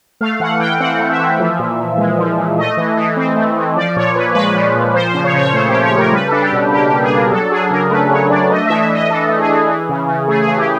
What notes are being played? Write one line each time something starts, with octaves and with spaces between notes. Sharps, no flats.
A3 F5
E3 F#5
E3 G5
C4 F#5
A3
E5
E3
F3
A#2
A#2
G#3
F3
A#2
A3 D#5
E3
E3
C4
A3
E3
F3 D5
A#2 C#5
A#2 B4
G#3 B4
F3
A#2
F3 C5
C#3 C5
C#5
C#3
C#5
A3 C5
F3 G4
C#5
C#3 A#4
G3 B4
D4 A4
G4
B2
A#3 G4
G4
G3
G#4
D4
A#4
F#3 A4
D4 G#4
C#3 A#4
A3 B4
F#3 C#5
D4 D5
A3 D#5
E3 E5
E5
E3 D#5
D4 A4
A3
G#4
E3
E3
C#3
C#3
A3 G#4
G#4
E3
G4